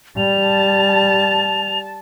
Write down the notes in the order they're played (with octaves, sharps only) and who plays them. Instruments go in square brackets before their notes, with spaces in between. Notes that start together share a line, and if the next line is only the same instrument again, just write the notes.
[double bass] G3 [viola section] A5 [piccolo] F7